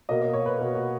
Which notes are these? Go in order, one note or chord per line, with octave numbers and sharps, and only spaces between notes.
B2 A#3 D#5
D#5
C#5
B4
B2 A#3
F#4